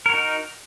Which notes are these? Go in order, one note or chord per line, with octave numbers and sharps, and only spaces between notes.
D#4 F#4 A#4